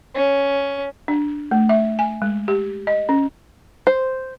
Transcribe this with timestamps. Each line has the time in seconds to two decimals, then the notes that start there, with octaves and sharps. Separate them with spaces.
0.15 C#4
1.08 D4
1.51 A3
1.69 E5
1.99 G#5
2.22 G#3
2.48 G4
2.87 D#5
3.09 C#4
3.87 C5